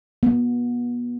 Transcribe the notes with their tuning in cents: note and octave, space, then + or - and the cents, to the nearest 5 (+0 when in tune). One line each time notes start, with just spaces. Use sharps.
B3 -35